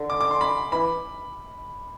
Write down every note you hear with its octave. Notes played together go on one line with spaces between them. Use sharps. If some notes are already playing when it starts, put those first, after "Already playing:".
Already playing: D3
D6
D6
C6
B5
E3 B5